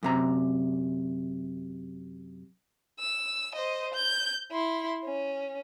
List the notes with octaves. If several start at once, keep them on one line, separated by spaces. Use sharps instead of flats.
F#2 C3 A#5
E6
C5 D#5
G6
E4 C6
C#4